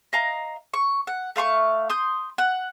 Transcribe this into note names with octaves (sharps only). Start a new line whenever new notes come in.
D#5 F5 A#5
C#6
F#5
A3 F5 C6 C#6
C6 D#6 G6
F#5